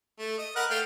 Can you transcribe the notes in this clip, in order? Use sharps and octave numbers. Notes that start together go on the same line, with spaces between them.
A3
D#5
A#4 B4 F#5
A3 F5 G5